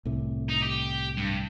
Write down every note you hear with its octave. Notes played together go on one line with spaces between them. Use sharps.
C2 A2 C3
D#4
G4
G2